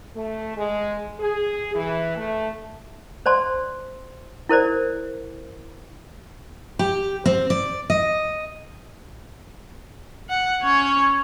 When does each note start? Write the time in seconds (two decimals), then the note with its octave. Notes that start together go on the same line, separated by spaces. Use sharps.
0.15 A3
0.56 G#3
1.19 G#4
1.75 E3
2.16 A3
3.26 C5 D5 A5 C6
4.49 E4 A#4 C5 D5
6.79 G4
7.26 C4
7.50 D5
7.90 D#5
10.29 F#5
10.62 C#4 C#5